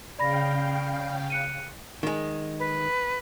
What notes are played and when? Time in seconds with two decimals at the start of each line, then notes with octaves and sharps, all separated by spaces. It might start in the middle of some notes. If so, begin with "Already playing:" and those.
0.19 C#3 D5 F5 G5 B5 A#6
1.30 F#6 C#7 D#7
2.03 D#3 G#3
2.59 B4